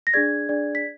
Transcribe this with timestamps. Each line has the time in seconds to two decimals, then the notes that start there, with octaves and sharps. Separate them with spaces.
0.07 A#6
0.14 D4 G#4 D5 G#6
0.49 D4 G#4 D5
0.75 B6